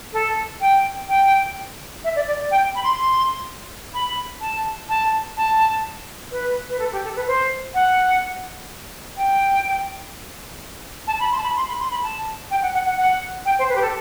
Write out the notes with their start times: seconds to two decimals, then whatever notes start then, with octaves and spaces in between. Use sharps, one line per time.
0.13 A4
0.61 G5
1.08 G5
2.04 E5
2.15 D5
2.27 D5
2.51 G5
2.75 B5
2.83 C6
2.99 C6
3.94 B5
4.41 A5
4.89 A5
5.37 A5
6.31 B4
6.69 B4
6.79 A4
6.92 G4
7.04 A4
7.16 B4
7.27 C5
7.74 F#5
9.17 G5
11.07 A5
11.20 B5
11.31 C6
11.37 A5
11.43 B5
11.56 C6
11.68 B5
11.79 C6
11.90 B5
12.03 A5
12.50 G5
12.62 F#5
12.74 F#5
12.86 F#5
12.97 F#5
13.45 G5
13.58 C5
13.69 B4
13.75 G4
13.82 A4